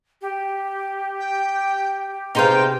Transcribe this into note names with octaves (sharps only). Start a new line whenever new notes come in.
G4
G5
C3 B3 D#4 G#4 C5 F5 G5